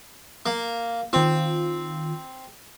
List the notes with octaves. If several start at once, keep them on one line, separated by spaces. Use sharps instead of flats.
A#3
D#3 C4 F4